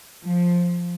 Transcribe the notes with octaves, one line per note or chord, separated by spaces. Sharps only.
F3